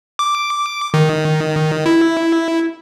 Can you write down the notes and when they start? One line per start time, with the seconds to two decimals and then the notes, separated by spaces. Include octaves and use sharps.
0.19 D6
0.94 D#3
1.86 E4